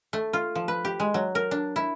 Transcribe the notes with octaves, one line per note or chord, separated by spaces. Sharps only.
A3
F4
F3
B4
G4
G#3
F#3
A#4
D4
E4